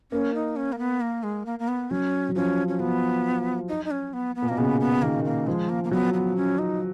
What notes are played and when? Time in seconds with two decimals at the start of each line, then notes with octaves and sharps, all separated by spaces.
0.12 A#3 C#4
0.34 D#4
0.56 C#4
0.72 A#3
0.79 B3
1.01 A#3
1.23 G#3
1.46 A#3
1.59 A#3
1.68 B3
1.91 F#3 C#4
2.29 F#3
2.35 F3 C#4
2.68 C#4
2.80 F3 B3
3.69 D#4
3.85 D#4
3.91 C#4
4.13 B3
4.36 B3
4.42 A#2
4.49 B2 A#3
4.58 C#3 B3
4.81 B3
5.02 D#3 A#3
5.25 A#3
5.47 F3 G#3
5.69 A#3
5.84 A#3
5.91 F#3 B3
6.14 B3
6.36 C#4
6.59 D#4